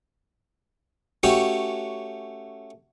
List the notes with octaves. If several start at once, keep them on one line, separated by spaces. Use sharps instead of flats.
A3 C#4 F#4 G4